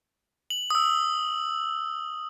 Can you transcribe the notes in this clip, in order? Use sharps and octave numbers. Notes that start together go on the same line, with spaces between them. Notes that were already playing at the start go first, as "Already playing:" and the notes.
F#7
D#6 E6